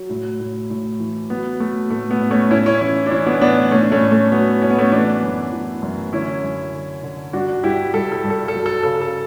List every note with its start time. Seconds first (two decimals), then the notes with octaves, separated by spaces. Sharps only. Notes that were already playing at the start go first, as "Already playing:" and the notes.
Already playing: F#3
0.10 A2
0.40 A2
0.70 A2
1.00 E3
1.30 F#3 B3
1.60 F#3 A3
1.90 A2 A3
2.11 B3
2.20 A2
2.31 A3 C#4
2.51 A2 C#4 E4
2.66 C#4 E4
2.81 E3 C#4 E4
3.06 D4
3.11 E3 C#4 E4
3.26 B3 D4
3.41 A2 B3 D4
3.71 A2 A3 C#4
3.83 D4
3.92 A3 C#4
4.02 A2
4.12 A3
4.32 F#3 B3
4.62 A2 C#4
4.70 B3
4.78 A3 C#4
4.92 E3 B3 D4
5.22 F#2
5.52 E3
5.82 F#2
6.13 D3 C#4 E4
6.43 F#2
6.73 D3
7.03 D3
7.33 G2 D4 F#4
7.64 G2 E4 G4
7.94 G2 A4
8.12 A4
8.24 G2
8.30 A4
8.48 A4
8.54 F#3
8.66 A4
8.83 C#3 A4
9.02 A4